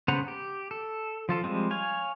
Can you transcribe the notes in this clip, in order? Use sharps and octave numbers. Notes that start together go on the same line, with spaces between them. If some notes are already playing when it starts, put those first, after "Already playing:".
C#3 B3 C5 F#5 A#5
G4
A4
F3 F4 A4
F3 G3 G#3 C4
C#5 F5 G#5